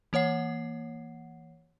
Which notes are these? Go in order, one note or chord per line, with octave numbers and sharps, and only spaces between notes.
E3 A#3 C#5 F#5 C7